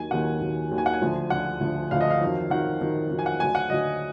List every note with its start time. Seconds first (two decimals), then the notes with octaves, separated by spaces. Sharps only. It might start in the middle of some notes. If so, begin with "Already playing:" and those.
Already playing: D#2 D#3 F#3 G#5
0.11 D#2 D#3 F#3 F#5
0.40 D#2 D#3 F#3
0.71 D#2 D#3 F#3
0.78 G#5
0.86 F#5
0.93 G#5
1.02 D2 D3 F3
1.30 D2 D3 F3 F#5
1.61 D2 D3 F3
1.91 D2 D3 F3 F5
2.01 D#5
2.10 F5
2.21 F2 D#3 F#3
2.50 F2 D#3 F#3 F#5
2.81 F2 D#3 F#3
3.10 F2 D#3 F#3
3.19 G#5
3.26 F#5
3.40 D2 D3 F#3 G#5
3.55 F#5
3.70 D2 D3 F#3 D#5